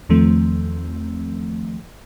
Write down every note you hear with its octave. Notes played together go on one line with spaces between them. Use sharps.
E2 D#3 F3 A3 C4